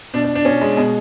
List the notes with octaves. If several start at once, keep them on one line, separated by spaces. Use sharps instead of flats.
B2 D4
D4
D4
B2 C#4
G#3
B2 G#3